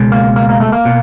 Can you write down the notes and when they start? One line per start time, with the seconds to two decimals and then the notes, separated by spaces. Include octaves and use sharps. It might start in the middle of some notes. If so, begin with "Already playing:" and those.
Already playing: C#2 B2 G#3
0.12 A#3
0.36 A#3
0.49 A#3
0.60 A3
0.72 A#3
0.85 B2